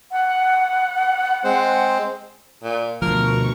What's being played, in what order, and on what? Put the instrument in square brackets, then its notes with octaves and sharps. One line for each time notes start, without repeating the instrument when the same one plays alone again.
[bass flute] F#5
[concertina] G#3 C4 C5
[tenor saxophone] A#2
[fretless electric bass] D2 F3 [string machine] B2 C#6 [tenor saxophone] A#4